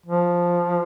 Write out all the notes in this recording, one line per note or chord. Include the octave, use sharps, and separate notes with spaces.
F3